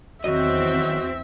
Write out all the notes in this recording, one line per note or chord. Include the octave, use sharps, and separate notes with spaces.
E2 D#3 F#3 C4 F#4 D#5 E5